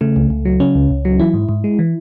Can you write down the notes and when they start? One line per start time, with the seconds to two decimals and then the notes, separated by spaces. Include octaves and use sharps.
0.01 C#3 A3
0.16 C#2
0.30 C#2
0.45 F#3
0.60 C#3 C#4
0.75 C#2
0.91 C#2
1.05 F#3
1.19 E3 E4
1.34 G#2
1.49 G#2
1.64 G#3
1.79 E3